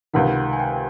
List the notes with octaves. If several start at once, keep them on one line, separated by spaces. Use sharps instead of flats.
C#2 C3 D#3 F#5
G#5
G5